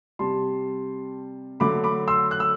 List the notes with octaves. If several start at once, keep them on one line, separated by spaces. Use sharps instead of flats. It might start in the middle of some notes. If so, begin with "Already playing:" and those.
C3 G3 A5 C6
D3 F#3 A3 B5 D6
B5 D6
C6 E6
F#6
E6